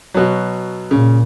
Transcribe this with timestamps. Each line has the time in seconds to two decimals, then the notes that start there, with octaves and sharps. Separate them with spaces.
0.14 B2 F#3
0.91 A#2 C#3